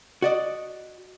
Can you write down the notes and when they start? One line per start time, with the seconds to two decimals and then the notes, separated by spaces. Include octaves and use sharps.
0.22 F#4 D5 D#5